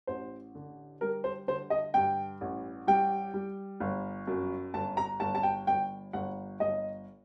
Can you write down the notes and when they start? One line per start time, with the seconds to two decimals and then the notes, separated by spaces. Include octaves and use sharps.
0.07 A1 C5
0.55 D3
1.01 G3 A#4
1.24 C5
1.48 D3 C5
1.70 D#5
1.94 G2 G5
2.41 A1
2.87 G3 G5
3.34 G3
3.80 G1
4.27 F#2
4.74 G1 A5
4.97 A#5
5.20 G1 A5
5.35 A5
5.43 G5
5.67 G1 G5
6.13 G1 F#5
6.60 G1 D#5